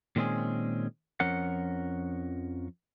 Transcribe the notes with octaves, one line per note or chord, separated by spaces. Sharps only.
A#2 D#3 G#3 C4 C#4 G#4
F2 F3 C#4 A#4 F#5